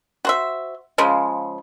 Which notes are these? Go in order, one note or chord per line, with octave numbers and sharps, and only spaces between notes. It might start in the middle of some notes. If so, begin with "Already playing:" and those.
F#4 C5 E5
C#3 F3 G#3